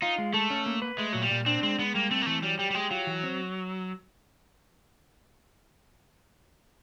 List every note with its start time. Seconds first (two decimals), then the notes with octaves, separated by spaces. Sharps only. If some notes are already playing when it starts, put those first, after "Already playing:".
0.02 D#4 F4
0.18 G#3
0.34 A3 A4
0.50 C#4
0.66 A#3
0.82 B4
0.98 G#3 A3
1.13 A#2 F#3
1.22 G3
1.31 A#2
1.46 C4 D4
1.63 G#3 C4
1.79 G#3 B3
1.95 G3 A#3
2.11 A3 C4
2.22 A#3
2.26 E3 A3
2.42 F#3 G3
2.59 G3 G4
2.70 G3
2.75 G#3 G4
2.91 F#3 F4
3.07 E3
3.23 C4